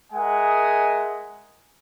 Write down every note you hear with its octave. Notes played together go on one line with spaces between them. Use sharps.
G#3 A#4 D#5 E5 F#5 G#5